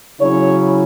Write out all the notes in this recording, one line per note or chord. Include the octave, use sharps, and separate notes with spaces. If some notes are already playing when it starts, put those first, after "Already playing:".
C#3 F#3 C#4 E4 C#5